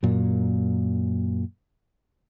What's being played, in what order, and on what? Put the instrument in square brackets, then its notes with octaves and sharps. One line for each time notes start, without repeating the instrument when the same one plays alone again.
[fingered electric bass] F#2 A#2 F#3